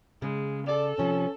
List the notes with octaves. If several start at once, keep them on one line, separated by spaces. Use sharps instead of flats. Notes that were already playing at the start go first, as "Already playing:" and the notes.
C#3 G#3
A4 D5
C3 F3 C#4